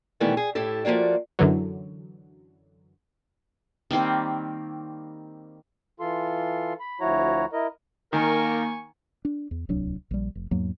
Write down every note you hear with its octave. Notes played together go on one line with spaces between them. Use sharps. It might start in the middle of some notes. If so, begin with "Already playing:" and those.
B2 D#3 E3 G3 A3 B3
G#4
A2 E4 G4 A4
F3 A3 A#3 F#4 D5
F#2 D3 E3 F#3
D#3 G3 A#3 C4
E3 F4 A4 C6
B5
D2 F3 E4 F#4 C#5 A#5
E4 A#4 D#5
D#3 A#3 A#4 G#5 C#6
D4
E2
D1 C2 F#3 D4
A#1 G3
F1
E2 G#2 F#3 A#3